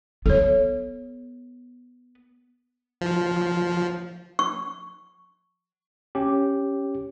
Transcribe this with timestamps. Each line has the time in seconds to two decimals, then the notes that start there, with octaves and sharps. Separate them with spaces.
0.26 B3 A4 C#5
3.01 F3
4.39 C#6
6.15 C#4 G4